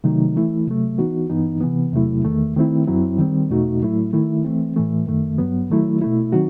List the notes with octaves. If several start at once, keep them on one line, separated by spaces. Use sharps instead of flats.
C3 D#3 F#3 A3 D#4
E3 A3 E4
C3 F#3 A3
E3 B3 D#4 F#4
G2 E3 B3 D#4
C3 E3 B3
E2 C3 F#3 A3 E4
E2 D#3 A3
D#3 A3 C4 E4
F#2 F#3 C4 E4
D#3 G3 C4
E2 B2 A3 D#4 F#4
A2 F#3 A3 E4
D#3 A3 E4
E3 A3 C4
A2 E3 A3
F#2 D#3 A3
G2 F#3 B3
D#3 F#3 A3 E4
B2 A3 E4
D#3 F#3 C4 D#4 F#4